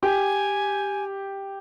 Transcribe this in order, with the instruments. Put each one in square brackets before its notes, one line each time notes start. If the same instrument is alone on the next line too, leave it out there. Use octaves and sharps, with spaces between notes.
[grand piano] G4 [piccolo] G#5